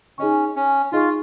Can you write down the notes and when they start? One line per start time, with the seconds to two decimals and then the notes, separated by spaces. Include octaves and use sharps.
0.18 C#4 D#4 G#4 D#5 G#5 C#6
0.56 C#4
0.92 D#4 F4 G#4 D#5 G#5 C#6